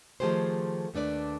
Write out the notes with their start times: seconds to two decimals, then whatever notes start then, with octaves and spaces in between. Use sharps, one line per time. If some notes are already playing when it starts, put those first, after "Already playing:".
0.20 D#3 F3 A3 G4 G#4 C5
0.94 D#2 A3 D4 B4 D5